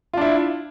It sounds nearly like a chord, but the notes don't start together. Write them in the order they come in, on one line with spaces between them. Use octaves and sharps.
F4 D4 E4